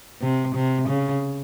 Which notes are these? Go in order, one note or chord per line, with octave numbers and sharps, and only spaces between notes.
C3
C3
C#3